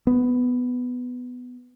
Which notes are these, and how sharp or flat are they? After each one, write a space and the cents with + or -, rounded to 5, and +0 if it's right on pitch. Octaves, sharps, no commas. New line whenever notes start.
B3 +10